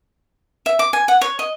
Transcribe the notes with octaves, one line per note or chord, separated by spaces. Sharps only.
E5
D6
G#5
F#5
C#5
D#5